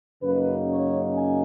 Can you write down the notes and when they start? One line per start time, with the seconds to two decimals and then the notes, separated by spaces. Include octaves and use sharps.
0.23 F#2 C#3 F#3 A#3 D#4 B4
0.68 C#5
1.13 G#5